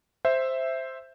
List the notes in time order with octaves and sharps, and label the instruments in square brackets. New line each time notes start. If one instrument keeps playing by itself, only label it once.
[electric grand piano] C5 E5